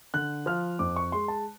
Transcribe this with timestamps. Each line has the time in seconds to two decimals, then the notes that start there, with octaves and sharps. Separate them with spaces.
0.14 D3 F#6
0.46 F3 F6
0.79 F2 D6
0.96 C#6
1.12 G#3 C6
1.28 A5